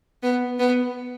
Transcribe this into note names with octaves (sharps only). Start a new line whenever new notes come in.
B3
B3